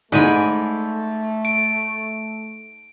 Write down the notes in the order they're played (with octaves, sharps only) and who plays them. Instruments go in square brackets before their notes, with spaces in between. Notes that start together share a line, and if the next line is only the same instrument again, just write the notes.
[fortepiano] G#2 [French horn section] A3 [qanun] D5 G#5 B5
[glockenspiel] D7